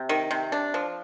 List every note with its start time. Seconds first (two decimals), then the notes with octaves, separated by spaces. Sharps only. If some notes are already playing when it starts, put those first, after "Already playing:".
Already playing: C3
0.09 D#3
0.31 C3
0.52 D4
0.74 F3